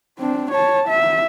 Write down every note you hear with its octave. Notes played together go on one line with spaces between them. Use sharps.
C4 D4
C#5 A5
E5